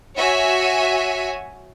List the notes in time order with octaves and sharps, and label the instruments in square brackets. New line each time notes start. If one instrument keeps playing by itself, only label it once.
[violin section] F#4 C#5 E5 G#5